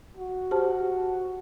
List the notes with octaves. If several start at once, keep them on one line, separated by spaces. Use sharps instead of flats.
F#4
G4 C5 A5